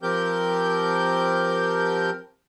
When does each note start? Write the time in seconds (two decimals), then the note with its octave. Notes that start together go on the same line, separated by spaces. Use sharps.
0.03 F3 C4 G4 A#4 G6